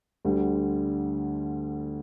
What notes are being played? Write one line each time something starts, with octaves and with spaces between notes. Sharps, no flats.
D2 D3 G3